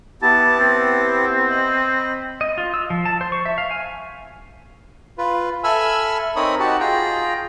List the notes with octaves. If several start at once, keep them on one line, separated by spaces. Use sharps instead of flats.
B3 E4 G4 A5
C4
D#5 B5
D#5
F4
E6
F3
A5
C5
C#6
E5
F5
G#5
F4 B4
A4 E5 G#5 B5 E6 F6
C4 D#4 A#4 C#5 B5 D#6
D#4 F#4 G4 F#5 A5
F4 G#4 G5 A#5